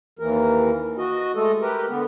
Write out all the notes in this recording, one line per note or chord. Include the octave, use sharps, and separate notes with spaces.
D#2 E3 A#4
F#4 D#5
G#3 A3 A4 D#5
G4 A#4 B4
D3 B3